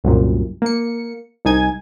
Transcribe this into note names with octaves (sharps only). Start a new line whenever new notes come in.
C2 F#2 A#2
A#3 C#7
C2 D#4 G#5 G#6